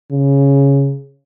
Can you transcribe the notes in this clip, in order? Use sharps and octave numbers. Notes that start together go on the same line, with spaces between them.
C#3